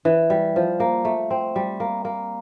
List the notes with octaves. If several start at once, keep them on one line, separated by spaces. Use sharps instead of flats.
E3
G3
F3
A#3
A3
C4
G3
A#3
A#3